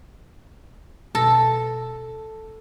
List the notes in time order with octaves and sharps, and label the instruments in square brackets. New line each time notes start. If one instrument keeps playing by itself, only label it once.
[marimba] B2 A#6 [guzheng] A4